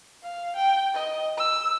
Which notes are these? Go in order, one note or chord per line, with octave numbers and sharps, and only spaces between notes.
F5
G5
D#5
E6